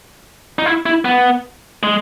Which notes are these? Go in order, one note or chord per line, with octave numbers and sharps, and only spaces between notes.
D#4
E4
E4
B3
G#3